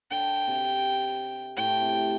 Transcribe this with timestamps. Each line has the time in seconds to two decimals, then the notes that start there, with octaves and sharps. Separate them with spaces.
0.11 D3 G5
0.48 C3
1.57 A2 G5
1.82 C3